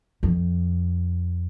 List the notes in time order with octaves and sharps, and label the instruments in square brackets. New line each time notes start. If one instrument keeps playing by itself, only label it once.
[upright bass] F2